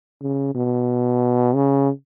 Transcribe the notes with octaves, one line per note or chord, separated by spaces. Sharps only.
C#3
B2
C#3